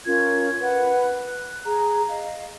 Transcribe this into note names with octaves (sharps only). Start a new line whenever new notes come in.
C#4 F4 A#4 G#6
B4 F#5
F#6
G#4 A#5
D#5 F5